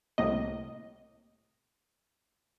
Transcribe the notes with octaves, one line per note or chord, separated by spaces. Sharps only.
C2 A2 A#3 D#5